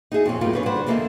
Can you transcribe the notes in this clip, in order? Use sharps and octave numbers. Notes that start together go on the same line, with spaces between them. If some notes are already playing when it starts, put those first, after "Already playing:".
D#4 F#4 G#4 E5
F2 A#2 C4 C#4
F#2 A2 G3 A#3 B3 F4
D3 B4 C#5
D3 G3 B4 C5 D5 F#5
E2 D3 A#3 A4 D#5 E5